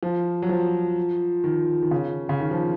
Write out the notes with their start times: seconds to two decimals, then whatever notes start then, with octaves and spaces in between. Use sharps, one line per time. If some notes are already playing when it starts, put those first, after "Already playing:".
0.03 F3
0.42 F#3
0.49 F3
1.44 D#3
1.82 D#3
1.91 C#3
2.29 C#3
2.40 D#3
2.51 F3